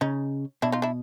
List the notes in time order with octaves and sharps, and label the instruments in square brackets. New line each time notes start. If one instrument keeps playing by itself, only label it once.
[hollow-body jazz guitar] C#3 [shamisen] C#4 D#4
[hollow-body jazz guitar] B2 [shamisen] D4 E4
[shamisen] D#4 F4
D4 E4